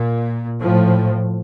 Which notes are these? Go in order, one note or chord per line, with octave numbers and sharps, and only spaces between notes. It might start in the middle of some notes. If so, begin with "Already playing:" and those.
Already playing: A#2
A2 F3